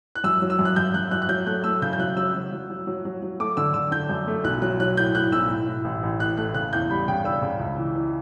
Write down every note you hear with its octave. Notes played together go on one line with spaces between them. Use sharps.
F#6
F#2 E6
F#3
E6
F#2
F#6
F#2 G6
F#2 F#6
F#2 F#6
F#6
F#3 G6
A3 F#6
A3 E6
C#3 G6
G6
F#3 F#6
F#3 E6
F#3
F#3
F#3
F#3
F#3
F#3
A3 D6
D3 E6
D3 E6
D3 G6
F#2
A3
B1 F#6
F#3 F#6
F#3 F#6
A2 G6
A2 F#6
B1 E6
A2
A2
A1
A1
A2 F#6
A3 F#6
C#3 F#6
E2 G6
G3 B5
C#3 G5
D4 E6
C#3
C#2
E3
E3